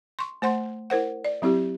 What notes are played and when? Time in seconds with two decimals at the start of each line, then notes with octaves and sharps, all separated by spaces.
0.19 C6 C#6
0.42 A3 C5 F#5 C6
0.90 E4 A#4 C5 F#5
1.25 D5
1.42 F#3 C4 E4 G4